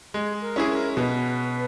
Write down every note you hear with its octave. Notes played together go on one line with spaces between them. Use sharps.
G#3 G#4
A#4
C#4 E4 G#4
A#4
B2 B4